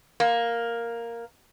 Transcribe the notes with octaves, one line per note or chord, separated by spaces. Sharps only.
A#3